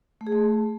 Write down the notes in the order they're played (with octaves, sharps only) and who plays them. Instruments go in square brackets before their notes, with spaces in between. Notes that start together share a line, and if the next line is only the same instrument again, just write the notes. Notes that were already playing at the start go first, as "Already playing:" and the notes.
[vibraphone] A3
G#4
A3